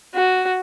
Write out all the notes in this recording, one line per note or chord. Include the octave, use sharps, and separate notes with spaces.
F#4